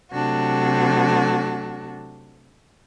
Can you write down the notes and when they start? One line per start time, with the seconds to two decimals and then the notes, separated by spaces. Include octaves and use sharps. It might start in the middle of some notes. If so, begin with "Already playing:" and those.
0.11 C3 F#3 A3 D4 F#4